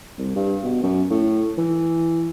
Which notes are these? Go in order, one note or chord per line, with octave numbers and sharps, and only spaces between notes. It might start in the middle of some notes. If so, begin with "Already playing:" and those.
C2
G2
B2
F#2
A2
E3